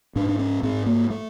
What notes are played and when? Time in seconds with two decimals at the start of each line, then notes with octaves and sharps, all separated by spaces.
0.16 G#2 D4
0.29 D4
0.39 C#4
0.63 G#2 C4
0.86 A#3
1.10 A3